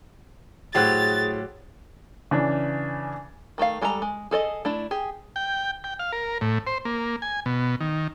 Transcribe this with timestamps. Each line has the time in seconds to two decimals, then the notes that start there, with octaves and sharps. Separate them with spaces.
0.75 A2 F#3 G4 G#4 C5 F#6 A6
2.31 C#3 E3 D4
3.58 D#3 A3 F4 F5
3.81 G3 G#3 A4 B4 A#5
4.02 G#3
4.31 G#4 A4 D5 D#5
4.65 A3 D4 E4
4.91 G4 G#4
5.36 G5
5.84 G5
5.99 F5
6.12 A#4
6.41 A2
6.67 C5
6.85 A#3
7.22 G#5
7.46 B2
7.80 D#3